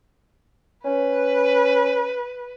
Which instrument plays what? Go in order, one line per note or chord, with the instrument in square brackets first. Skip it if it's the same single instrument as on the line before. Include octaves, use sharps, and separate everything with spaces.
[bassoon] C#4 [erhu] B4